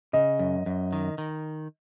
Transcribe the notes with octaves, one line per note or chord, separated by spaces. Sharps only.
C#3 D#5
F#2
F#2
D#3
D#3